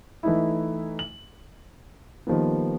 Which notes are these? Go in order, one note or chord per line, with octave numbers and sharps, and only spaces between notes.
E3 A3 D#4 E4
F#7
D#3 F3 G3 A#3 B3